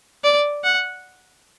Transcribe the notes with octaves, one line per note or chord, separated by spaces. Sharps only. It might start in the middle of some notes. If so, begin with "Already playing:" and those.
D5
F#5